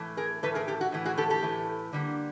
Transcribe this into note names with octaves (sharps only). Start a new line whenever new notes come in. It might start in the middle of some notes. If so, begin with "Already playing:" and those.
Already playing: A2 E3 A3
G#4 A#4
A2 E3 A3 A4 B4
G#4 A#4
G4 A4
F#4
A2 E3 A3
F#4 G#4
G4 A4
G4 A4
A2 E3 A3
D3 G3 A#3